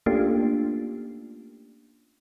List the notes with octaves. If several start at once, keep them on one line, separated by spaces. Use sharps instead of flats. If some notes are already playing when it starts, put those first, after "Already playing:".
A3 A#3 C#4 D4 F4 G4